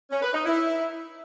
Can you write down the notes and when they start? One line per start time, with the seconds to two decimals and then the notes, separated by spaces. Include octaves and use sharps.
0.10 C#4
0.22 B4
0.33 D#4
0.45 E4